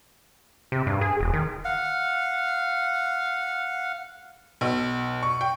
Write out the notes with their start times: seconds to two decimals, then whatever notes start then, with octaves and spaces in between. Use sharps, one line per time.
0.72 C3
0.87 G2
1.01 G#4
1.20 E1
1.33 D#3
1.65 F5 F#5
4.61 B1
5.23 C#6
5.41 G5